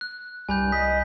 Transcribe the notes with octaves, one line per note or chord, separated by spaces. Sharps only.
F#6
C2 G2 G#5 B5 G6
D#5 B6